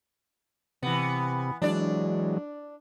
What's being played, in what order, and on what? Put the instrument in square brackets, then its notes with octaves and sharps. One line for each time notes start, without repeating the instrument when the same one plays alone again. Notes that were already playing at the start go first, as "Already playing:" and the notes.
[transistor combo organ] C3 [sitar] E3 B3
[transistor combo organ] E3 F#3 G#3 [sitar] D4 D5